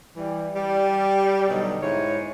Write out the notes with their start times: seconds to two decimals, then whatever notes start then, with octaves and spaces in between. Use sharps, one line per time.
0.16 E3 G3
0.56 G3
1.49 B2 D3 F#3 D#4
1.81 G#2 E4 C#5